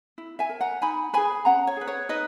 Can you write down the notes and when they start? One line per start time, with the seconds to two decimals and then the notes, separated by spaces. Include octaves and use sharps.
0.18 E4
0.39 E5 G#5
0.49 A#4
0.61 F#5 A#5
0.82 D#4 G#5 B5
1.13 G#4 B4 G#5 B5
1.45 C#4 F#5 A#5
1.67 C#5
1.77 G#4 B4
1.87 C#5
2.09 D#4 B4 D#5